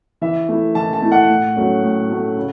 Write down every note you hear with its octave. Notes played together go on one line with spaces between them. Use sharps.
E3 E5
A3 E4
E3 A5
A5
A3 E4
F#5
A2
F#3 A3 C#4
A2
F#3 A3 C#4
C#3